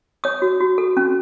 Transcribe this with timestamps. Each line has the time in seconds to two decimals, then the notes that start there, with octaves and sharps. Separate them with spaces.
0.24 C#5 D#6
0.42 F#4
0.60 F#4
0.78 A4
0.97 C#4